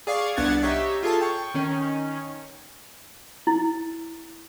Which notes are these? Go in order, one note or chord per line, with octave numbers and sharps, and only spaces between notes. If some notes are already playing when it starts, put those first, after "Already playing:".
G#4 D5 F5 G#5 C#6
C2 B3 D4 F#5 G#6 A6
D#4 G4 C#5 E5
F4 G#4 A4 A5
G5 C#6
D#3 C#4
E4